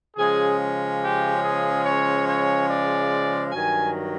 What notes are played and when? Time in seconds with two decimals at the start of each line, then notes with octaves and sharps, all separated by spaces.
0.17 C#3 F3 G#3 C#4 G#4
1.00 G4
1.42 G#4
1.85 C#5
2.26 C#5
2.68 D5
3.52 G2 D#3 F#3 G#5